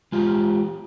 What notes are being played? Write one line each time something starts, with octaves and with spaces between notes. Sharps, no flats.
G#3 F4 G4